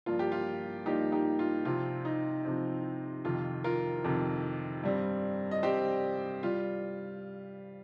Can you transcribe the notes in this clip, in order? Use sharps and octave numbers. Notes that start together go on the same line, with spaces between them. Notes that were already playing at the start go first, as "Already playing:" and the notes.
G2 F3 A#3 F4
G4
F4
G2 F3 A#3 D#4 G4
D#4 G4
F4
C3 F3 C4 F4
D#4
C3 F3 C4
F2 C3 D#3 F4
F4 A#4
F2 C3 D#3
G2 G3 C4
D#5
G2 G3 C4 G4 C5
G3 F4